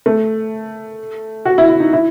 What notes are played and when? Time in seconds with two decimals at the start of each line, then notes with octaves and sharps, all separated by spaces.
0.06 A3
1.45 F#4
1.58 E4
1.69 E4
1.80 D#4
1.93 E4